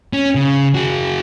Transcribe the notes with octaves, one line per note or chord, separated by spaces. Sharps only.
C#4
C#3
F#4 G#4